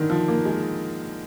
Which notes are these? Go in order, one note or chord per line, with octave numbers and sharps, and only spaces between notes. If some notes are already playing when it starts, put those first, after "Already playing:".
Already playing: D3 D#3
F3
A#3
G#3